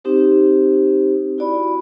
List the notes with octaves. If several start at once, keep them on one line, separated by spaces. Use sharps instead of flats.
C4 D#4 G4 C5
E4 F#4 D5 B5